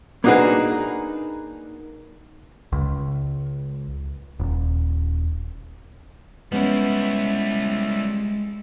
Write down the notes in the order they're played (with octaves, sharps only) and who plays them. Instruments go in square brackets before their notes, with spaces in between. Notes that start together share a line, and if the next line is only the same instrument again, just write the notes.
[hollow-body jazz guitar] A#3 D4 D#4 F#4 G#4 B4
[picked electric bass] C#2
D#1
[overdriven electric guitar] G3 E4 [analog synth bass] G#3 [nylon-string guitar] B3 C#4